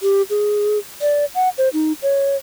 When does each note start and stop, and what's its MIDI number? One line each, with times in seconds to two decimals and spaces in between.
0.03 0.22 67
0.30 0.78 68
1.02 1.25 74
1.35 1.49 78
1.58 1.69 72
1.73 1.93 63
2.03 2.36 73